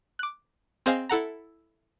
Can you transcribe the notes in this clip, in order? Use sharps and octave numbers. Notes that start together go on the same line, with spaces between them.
D6 F#6
C4 G#4 C5 D#5 F5 G#5
E4 A4 F#5 A#5